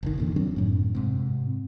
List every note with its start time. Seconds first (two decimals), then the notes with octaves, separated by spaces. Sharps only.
0.03 G1 C2 D#3
0.18 E2 A#2 D3
0.36 D#3 F#3 C4 D4
0.56 F#2 A2
0.95 G#2 C3